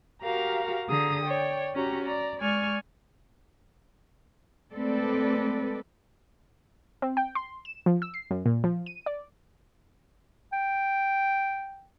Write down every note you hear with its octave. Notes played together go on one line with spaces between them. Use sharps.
F#4 G4 A#4 F5 A#5
D3 G#4 A#5 D#6
C#5 D5 G5
C#4 F#4 G4 A#5
D5 A#5
G#3 D5 G#5 C#6 F6
G#3 A3 C4 A4 B4 D5
C4
G5
C6
E7
F3
E6
C7
F#2
A#2
F3
D#7
D5
G5